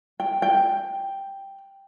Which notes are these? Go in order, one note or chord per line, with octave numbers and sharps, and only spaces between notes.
G5
G5